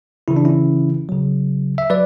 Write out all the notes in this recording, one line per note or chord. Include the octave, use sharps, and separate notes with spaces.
C#3 E3 E4
D4
C#4 E4
C#3 F#3
E5
F#3 B4 D5